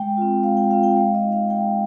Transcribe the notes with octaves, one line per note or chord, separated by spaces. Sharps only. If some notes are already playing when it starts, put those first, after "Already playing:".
Already playing: G#3 G5
C4 F4
G#3 F5
G5
C4 F4 F5
G5
G#3 F5
D#5
D#4
F5
G#3 G5